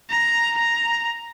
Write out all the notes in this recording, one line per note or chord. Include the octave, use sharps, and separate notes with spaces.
A#5
A#5